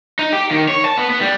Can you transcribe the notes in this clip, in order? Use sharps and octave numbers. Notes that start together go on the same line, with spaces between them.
D#4
G4
D#3
C#5
A5
B3
B3
G3